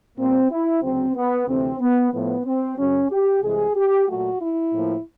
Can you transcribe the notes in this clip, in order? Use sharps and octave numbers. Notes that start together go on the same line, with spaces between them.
A#2 G3 A#3 C4
E4
D2 C#3 F#3 C4
B3
D2 C3 E3 A3 C4
B3
A2 F3 A3 B3
C4
F#2 C#3 F#3 C#4
G4
C2 C3 E3 G#3 G#4
G4
A#2 F#3 A3 F#4
E4
A2 F3 A#3